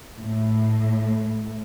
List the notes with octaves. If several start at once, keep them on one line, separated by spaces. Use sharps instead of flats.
A2